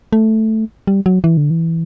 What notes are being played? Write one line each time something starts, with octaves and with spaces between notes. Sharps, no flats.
A3
G3
F#3
E3
D3
E3